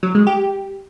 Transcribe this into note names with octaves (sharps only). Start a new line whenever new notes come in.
F#3
G#3
G4